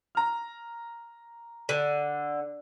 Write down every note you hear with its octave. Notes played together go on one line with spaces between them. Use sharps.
A#5 F6
D3